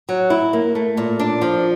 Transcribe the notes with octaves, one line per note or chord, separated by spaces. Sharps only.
F#3
E4
A#3
A3
A#2
D4
F3